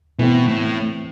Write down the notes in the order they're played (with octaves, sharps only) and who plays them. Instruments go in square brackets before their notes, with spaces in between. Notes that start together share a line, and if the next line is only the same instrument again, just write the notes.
[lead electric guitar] B2 [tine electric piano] E3 A3 C4
[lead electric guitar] A2